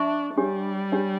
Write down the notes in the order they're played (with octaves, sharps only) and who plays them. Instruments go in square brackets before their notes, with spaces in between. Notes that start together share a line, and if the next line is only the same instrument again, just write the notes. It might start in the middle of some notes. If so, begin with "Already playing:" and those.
Already playing: [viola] D4 [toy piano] E5 A5 C#6
[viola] G3 [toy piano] D4 G4 C#5
[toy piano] D4 G4 C#5